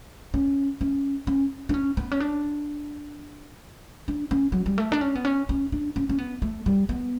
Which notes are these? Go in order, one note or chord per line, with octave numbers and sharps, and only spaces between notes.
C#4
C#4
C#4
D4
C#4
B3
C#4
D4
D4
C#4
F#3
G3
A3
D4
C#4
B3
C#4
C#4
D4
C#4
C#4
B3
A3
G3
B3